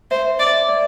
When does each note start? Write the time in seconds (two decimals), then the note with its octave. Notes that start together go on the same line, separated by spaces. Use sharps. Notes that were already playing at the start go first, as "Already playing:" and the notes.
0.11 C5 E5
0.40 D5 E5
0.69 D5